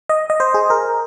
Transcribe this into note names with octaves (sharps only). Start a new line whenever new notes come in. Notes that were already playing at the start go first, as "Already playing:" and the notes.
D#5
D#5
C5
G#4
A#4